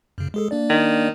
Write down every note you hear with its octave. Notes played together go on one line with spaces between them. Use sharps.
F#2 C#3
G#3 G#4 A4
A#3 D4 D5
D#3